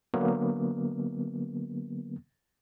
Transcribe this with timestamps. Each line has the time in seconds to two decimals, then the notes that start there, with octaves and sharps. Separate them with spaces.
0.14 D3 F#3 A#3 B3